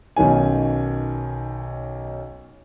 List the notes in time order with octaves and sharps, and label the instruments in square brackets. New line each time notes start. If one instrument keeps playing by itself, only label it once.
[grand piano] B1 D#3 C#4 G#5